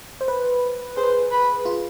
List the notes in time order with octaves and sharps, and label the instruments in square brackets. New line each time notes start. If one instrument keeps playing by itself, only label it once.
[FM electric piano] C5
B4
[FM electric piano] G#4 [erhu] C5
[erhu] B4
[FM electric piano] F4